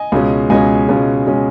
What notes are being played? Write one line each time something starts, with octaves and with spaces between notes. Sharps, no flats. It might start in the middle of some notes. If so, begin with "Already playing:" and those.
Already playing: D#5 G#5
C#2 B2 G#3 C#4
C#2 B2 G#3 C#4 D#5 G#5
C#2 B2 G#3 C#4
B2 G#3 C#4